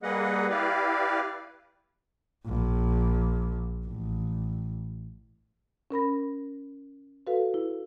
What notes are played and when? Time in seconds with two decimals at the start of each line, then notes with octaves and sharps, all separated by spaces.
0.03 G3 A#3 G#4 B4 D#5 F#5
0.50 E4 G4 B4 D5 F5
2.46 A#1
3.85 A1
5.91 C#4 A#4 B5 A#6
7.27 F#4 A4 B4 F5
7.54 E4